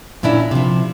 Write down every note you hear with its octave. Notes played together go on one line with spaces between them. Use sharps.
F#2 A#2 C#4 D4 E4
C3 F3